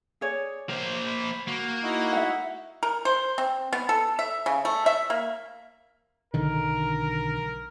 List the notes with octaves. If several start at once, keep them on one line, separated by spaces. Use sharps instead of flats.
G#4 C#5 D5
A#3 C5
B5
A#3 F#4
D#4 E4 F#4
E5 F#5
A#4
C5
C4
B3
A4
E5
C#3
A3
E5
A#3
B1 D3 D#3 A#4